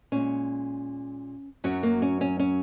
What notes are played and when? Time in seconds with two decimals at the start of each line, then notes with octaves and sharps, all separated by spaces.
0.12 A#2 G#3 C#4
1.64 F#2 F#3 C#4
1.83 A#3
2.02 C#4
2.21 C#4
2.39 C#4